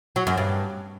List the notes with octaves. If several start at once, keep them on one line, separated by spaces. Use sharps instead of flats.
F#3
F#2
G2